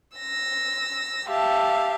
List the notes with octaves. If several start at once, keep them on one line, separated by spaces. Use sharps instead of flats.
E6 A#6
G4 E5 F5 A5